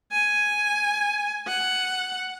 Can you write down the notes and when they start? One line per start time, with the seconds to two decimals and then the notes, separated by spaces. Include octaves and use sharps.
0.12 G#5
1.47 F#5